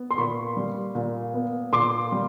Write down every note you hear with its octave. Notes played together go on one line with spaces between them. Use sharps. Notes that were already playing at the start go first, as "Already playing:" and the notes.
Already playing: B3
C6
A#2 B5 C#6
G3
A#2
B3
A#2 C6 D6
G3